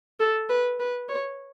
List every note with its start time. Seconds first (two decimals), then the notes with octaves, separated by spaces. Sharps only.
0.20 A4
0.49 B4
0.79 B4
1.09 C#5